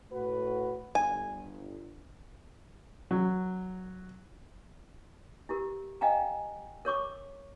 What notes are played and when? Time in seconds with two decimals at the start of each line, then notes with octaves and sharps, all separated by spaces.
0.11 A2 F#4 B4
0.95 G1 G#5
3.11 F#3
5.49 E4 G4 A#4
6.01 D#5 F5 G5 G#5 A#5
6.85 A#4 C#5 C#6 D6